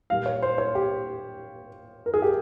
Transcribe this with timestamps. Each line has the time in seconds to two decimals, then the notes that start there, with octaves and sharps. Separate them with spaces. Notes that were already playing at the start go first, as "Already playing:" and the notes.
0.10 A#2 G3 A#3 F5
0.26 C#5
0.42 C5
0.58 C#5
0.75 G4
2.06 A#4
2.14 G#4
2.22 G4